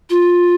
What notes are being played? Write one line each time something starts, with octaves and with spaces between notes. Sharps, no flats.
F4